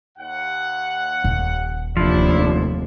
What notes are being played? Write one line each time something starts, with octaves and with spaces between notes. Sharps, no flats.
D#2 F#5
D#1
F1 D#2 F3 D4 E4